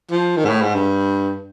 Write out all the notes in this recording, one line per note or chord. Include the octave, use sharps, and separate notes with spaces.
F3
D#3
G#2
A2
G#2
G2